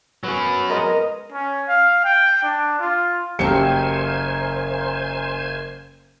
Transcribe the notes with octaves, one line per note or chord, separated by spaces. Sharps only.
F#3 B3 C#4
G#3 A#4 D#5
C#4
F5
G5
D4
F4
F#1 F#2 A#3 G4 A4 C5 G#5 C#7